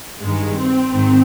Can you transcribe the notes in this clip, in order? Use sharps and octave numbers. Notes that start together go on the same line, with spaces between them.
G2 D#3 G#3
C4
G#2 D#3